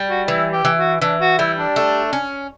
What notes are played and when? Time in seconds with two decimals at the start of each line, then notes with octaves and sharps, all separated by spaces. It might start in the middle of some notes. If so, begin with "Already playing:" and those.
Already playing: G3
0.09 F#4
0.28 E3 E4
0.52 G4
0.65 E3
0.77 F#4
1.02 E3 D4
1.20 F#4
1.38 G3 E4
1.57 D4
1.76 A3
2.13 C#4